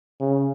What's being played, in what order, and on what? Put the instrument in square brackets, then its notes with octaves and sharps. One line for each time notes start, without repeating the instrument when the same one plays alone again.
[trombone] C#3